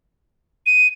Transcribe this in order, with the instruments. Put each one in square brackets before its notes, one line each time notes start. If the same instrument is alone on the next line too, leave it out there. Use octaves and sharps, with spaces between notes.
[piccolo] D#7